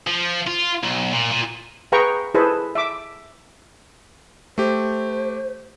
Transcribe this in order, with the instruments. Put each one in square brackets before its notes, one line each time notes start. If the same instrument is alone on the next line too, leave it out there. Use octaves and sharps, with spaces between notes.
[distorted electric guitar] F3
F4
B1
A#2
A#2
[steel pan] G#4 B4 F5 G5 A#5 C#6
E4 G#4 A4 B4 C5
E5 D6
[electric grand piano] A3 G4 [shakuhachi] C5